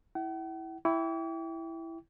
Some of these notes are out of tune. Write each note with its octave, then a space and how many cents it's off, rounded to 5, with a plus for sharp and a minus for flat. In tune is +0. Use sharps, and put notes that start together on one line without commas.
E4 -10 F#5 +45
E4 +0 G5 +0 D6 -45